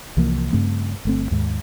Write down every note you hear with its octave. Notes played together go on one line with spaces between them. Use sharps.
C2 E3 F3 A#3
G2 C#3 A3 C4
G1 A3 C4
D#2 G#2